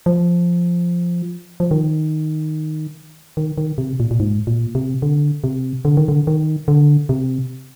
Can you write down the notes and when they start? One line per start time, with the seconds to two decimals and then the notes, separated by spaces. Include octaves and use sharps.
0.06 F3
1.60 F3
1.71 D#3
3.37 D#3
3.58 D#3
3.78 C3
4.00 A#2
4.11 A#2
4.20 G#2
4.47 A#2
4.75 C3
5.02 D3
5.44 C3
5.85 D3
5.97 D#3
6.08 D3
6.27 D#3
6.68 D3
7.09 C3